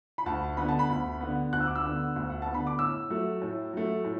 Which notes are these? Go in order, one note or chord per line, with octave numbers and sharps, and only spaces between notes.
B5
D2 A5
D3 B3 B5
A5
B5
D2
D3 B3
D2 F#6
E6
D6
E6
D3 B3
D2
F#5
B3 A5
D3 B5
D6
A2 E6
F#3 A3
A2
F#3 A3
A2